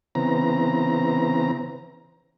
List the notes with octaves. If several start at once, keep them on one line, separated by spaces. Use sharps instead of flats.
C#3 E3 B3 C4 A#5